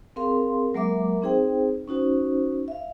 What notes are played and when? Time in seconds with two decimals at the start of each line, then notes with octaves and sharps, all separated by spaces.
0.16 C4 G#4 A#4 F5 C6
0.74 F#3 G#3 A#3 A#4 E5 D6
1.22 C4 D#4 G#4 C5 G5
1.88 C#4 D#4 F#4 C5
2.68 E5 F5